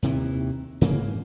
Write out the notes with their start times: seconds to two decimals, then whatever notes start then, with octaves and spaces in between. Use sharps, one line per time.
0.02 D#2 C3 D#3 E3
0.81 G#2 C#3 E3 A#3